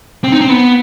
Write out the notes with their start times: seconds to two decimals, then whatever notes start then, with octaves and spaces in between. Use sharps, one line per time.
0.24 C4
0.32 D#4
0.41 C4
0.49 B3